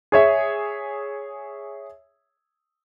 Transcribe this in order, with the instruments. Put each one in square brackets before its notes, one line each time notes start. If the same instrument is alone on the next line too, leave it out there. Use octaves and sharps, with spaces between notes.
[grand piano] G#4 C#5 E5